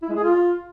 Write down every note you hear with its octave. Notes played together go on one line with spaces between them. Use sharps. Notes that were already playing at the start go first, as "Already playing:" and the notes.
E4
G#3
G#4
F4